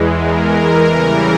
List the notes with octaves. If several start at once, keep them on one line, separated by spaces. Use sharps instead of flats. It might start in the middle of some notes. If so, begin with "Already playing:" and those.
Already playing: E2 E3 G#3
A#4
C#3 E3 G3